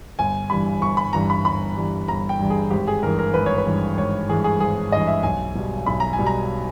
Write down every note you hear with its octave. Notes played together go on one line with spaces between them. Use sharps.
G1 G#5
G2 E3 G3 B5
G1 C#6
B5
G2 E3 G3 A#5
B5
G1 B5
G2 E3 G3
G1 A#5
G5
G2 E3 G3
G#4
G#1 G4
G#4
G2 E3 A#4
A#4
G#1 B4
C#5
B4
G2 E3
G#1 C#5
G2 E3 G#4
G#4
G#1 G#4
G2 E3 D#5
E5
B1 G#5
B2 G3
B1 B5
A#5
G#5
B2 G3
A#5